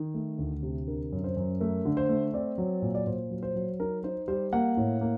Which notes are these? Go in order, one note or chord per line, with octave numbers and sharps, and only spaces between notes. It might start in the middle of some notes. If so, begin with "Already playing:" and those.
Already playing: D#3
A3
D2
C3
D3 A#4
F#2
C5
F#2
A3 A#4
D3
C5
A3
C4 D5
F#3
A#2
D5
A#2 C5
F#3
C5
F#3
D#4 A#4
D#4 C5
G3 C5
A#3 F#5
A2
A#3